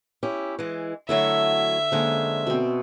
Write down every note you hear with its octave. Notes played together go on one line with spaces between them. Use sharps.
C#4 E4 G4
E3 G#3
D3 F#3 A3 E4 E5
F2 D3 G#3 A#3 C#4 C5
B2 C4